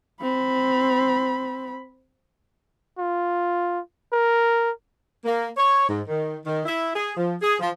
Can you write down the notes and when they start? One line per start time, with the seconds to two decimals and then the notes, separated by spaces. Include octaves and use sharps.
0.21 C4 B5
2.99 F4
4.13 A#4
5.24 A#3
5.56 C#5
5.88 G#2
6.08 D#3
6.45 D#3
6.66 E4
6.95 G#4
7.17 F3
7.41 G#4
7.59 F3